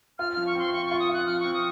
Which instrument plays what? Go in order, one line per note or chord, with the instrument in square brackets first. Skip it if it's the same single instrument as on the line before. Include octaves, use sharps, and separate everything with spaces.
[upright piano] F4 [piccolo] F6
[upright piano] F3 [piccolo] F6
[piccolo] C#6
[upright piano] C4 [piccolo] C6
[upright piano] F4 [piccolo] C#6
[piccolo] C#6
[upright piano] F4
[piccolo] D#6
[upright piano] F4 [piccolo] F#6
[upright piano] F3 [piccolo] F6
[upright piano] C4 [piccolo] C#6
[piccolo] D#6